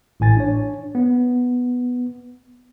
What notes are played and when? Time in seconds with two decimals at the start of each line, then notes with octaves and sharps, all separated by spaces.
0.20 A1 A2 G#5 A6
0.37 D4 C#5
0.95 B3